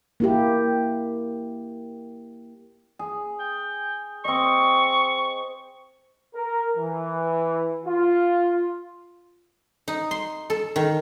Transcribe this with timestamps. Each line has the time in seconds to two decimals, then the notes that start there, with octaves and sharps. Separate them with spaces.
0.20 A#3 E4 G4
2.99 G#4
3.39 G5
4.25 C4 D#5 C#6
6.35 A#4
6.77 E3
7.86 F4
9.88 D#4
10.11 C6
10.50 A4
10.76 D#3